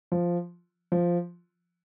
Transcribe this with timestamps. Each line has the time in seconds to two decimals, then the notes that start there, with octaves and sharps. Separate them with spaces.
0.12 F3
0.92 F3